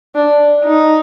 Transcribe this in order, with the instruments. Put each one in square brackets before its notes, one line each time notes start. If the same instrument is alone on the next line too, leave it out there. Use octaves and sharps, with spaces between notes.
[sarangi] D4
D#4